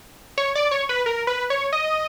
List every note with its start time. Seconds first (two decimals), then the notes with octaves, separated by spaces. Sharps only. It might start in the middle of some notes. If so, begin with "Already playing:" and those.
0.38 C#5
0.55 D5
0.71 C#5
0.89 B4
1.06 A#4
1.27 B4
1.50 C#5
1.73 D#5